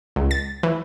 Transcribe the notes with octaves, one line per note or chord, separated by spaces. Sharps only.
C#2
A6
E3